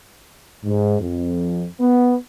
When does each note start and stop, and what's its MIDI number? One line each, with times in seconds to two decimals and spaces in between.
0.64 0.99 44
1.00 1.66 41
1.80 2.15 59